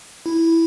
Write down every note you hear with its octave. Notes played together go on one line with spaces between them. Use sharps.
E4